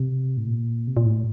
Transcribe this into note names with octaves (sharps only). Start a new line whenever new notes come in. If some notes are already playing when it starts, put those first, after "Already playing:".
Already playing: C3
A2
A#2
C3
A#2
A2